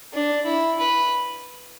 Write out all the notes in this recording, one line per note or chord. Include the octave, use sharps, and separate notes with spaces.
D4
E4
B4